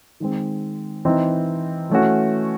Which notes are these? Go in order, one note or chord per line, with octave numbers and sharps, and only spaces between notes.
D#3 G#3 C4
E3 C4 D#4
E3 A3 C#4 F#4